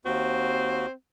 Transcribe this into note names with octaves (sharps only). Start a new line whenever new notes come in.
D#2 C4 F#4